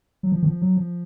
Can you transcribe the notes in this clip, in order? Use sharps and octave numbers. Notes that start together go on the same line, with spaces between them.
F#3
F3
D#3
F3
F#3
F3